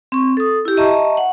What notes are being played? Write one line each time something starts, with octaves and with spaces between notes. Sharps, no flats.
C4 C#6
A4 D#6
E4 G4
D#5 E5 A5 A#5 C#6
F#5